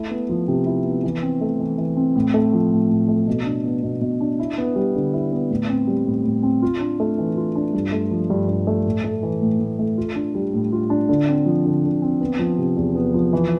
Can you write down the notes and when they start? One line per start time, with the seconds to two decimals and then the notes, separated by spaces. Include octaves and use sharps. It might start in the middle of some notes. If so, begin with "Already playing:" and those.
Already playing: A3 E4
0.11 B3
0.29 F3
0.48 C3
0.66 E4
0.85 B3
1.04 E3
1.22 C4
1.41 A3
1.60 E3
1.78 E3
1.97 C4
2.15 A2
2.34 A3
2.53 F3
2.72 A2
2.90 A2
3.08 A3
3.27 B2
3.45 D4
3.64 B3
3.83 B2
4.01 B2
4.21 D4
4.39 E4
4.58 B3
4.75 G3
4.95 D3
5.13 E4
5.32 B3
5.51 A2
5.70 C4
5.87 G3
6.06 A2
6.25 A2
6.43 C4
6.62 F4
6.80 D4
7.00 A3
7.18 E3
7.37 F4
7.55 D4
7.74 G2
7.92 A3
8.11 F3
8.30 G2
8.48 G2
8.67 A3
8.85 A2
9.04 A3
9.23 E3
9.42 A2
9.60 A2
9.79 A3
9.98 F4
10.15 D4
10.35 G3
10.54 A2
10.72 F4
10.90 D4
11.09 D3
11.28 C4
11.46 F3
11.65 D3
11.84 D3
12.02 C4
12.21 B3
12.39 F3
12.58 C3
12.77 E2
12.95 B3
13.14 F3
13.33 E3